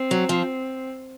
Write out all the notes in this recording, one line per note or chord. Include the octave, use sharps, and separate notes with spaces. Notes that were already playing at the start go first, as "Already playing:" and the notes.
Already playing: C4
F#3
F3